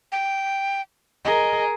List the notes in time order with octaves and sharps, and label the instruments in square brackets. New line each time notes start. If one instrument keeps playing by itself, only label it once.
[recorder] G5
[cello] G#4 A#4 [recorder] D#5